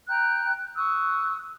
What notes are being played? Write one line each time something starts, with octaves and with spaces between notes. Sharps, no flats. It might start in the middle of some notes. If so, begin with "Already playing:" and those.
G5 A#5 F#6 G6
C#6 D#6 E6 F#6